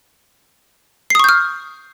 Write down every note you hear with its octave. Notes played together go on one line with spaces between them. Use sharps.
C#6 D#6 F6 G6 C7